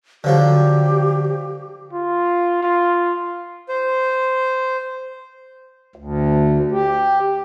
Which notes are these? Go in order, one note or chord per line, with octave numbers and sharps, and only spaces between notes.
D3 F3 F#3 G4
F4
F4
C5
D2
G4